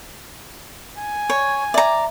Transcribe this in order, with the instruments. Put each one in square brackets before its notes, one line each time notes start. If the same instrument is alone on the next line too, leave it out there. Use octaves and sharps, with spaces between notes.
[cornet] G#5
[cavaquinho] C#5
[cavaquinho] D5 A#5 [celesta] E5